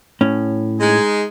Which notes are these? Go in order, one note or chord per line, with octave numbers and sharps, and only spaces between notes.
A2 C#4
G#3 D#4 G#4